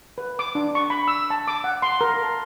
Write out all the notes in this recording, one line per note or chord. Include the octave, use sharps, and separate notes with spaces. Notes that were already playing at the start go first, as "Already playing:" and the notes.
B4
D6
D4
C#6
B5
E6
A5
D6
F#5
C6
A#4
A5